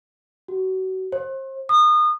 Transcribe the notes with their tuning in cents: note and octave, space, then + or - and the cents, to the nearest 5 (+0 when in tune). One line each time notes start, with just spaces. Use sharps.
F#4 +30
C5 +35
D#6 -30